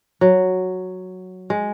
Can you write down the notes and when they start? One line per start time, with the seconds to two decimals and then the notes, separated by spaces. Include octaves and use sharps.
0.21 F#3
1.50 G#3